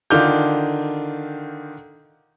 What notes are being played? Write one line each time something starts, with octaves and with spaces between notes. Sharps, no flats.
D3 D#3 F4 D6 F6 G6